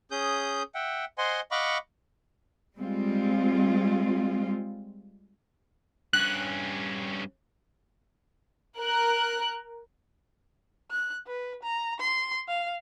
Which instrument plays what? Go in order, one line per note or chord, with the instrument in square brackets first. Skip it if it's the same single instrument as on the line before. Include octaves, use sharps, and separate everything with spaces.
[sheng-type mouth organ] C#4 G#4 D#6 G6
E5 F#5 G5
C5 D#5 F#5 G#5 C6
D#5 F5 F#5 B5 C#6 D6
[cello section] G3 G#3 C4 F4
[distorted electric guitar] G2 C#4 [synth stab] F#6
[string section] A#4 F#6
[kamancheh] F#6
B4
A#5
C6
F5